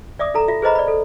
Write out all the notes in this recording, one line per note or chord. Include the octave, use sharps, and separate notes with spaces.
D5 E5 D6 D#6
D#4 A4 A#5
F4 E5
G#4 B4 C5 D#5 A#5 B5
D5 B5
A4